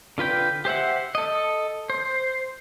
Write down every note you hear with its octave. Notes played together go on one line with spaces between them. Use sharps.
D3 F4 B4 G5
G4 C5 E5 F#5
A4 D#5
C5